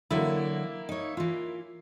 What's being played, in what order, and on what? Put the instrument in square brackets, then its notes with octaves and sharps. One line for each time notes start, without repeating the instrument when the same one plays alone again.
[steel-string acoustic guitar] D3 E3 F#3 [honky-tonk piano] A#3 E4
[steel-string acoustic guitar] D#4 C#5
E3 F4